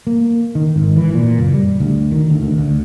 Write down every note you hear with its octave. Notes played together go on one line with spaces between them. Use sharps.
A#3
D#3
G#1
E3
A#2
F#1
G3
D2
D#3
D2
D2
D2